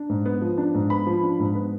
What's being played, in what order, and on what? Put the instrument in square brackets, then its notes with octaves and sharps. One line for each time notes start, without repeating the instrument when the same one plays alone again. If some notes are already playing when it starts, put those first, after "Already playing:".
Already playing: [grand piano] D4
G#2
B3
F3
D4
G#2
B3 B5
F3
D4
G#2
B3